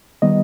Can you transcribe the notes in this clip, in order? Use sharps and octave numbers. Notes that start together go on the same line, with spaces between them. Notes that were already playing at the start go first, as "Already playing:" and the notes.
D#3 G3 B3 D#5